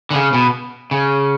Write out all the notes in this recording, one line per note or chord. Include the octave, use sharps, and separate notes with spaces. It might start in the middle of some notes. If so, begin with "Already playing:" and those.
D3
C#3
B2
C#3